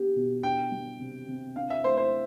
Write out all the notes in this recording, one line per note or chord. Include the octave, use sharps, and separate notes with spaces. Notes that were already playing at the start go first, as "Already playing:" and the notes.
Already playing: B3 D4 G4
B2
D4 G5
G3
C3
C3
D4 F5
E5
A3 C5
C5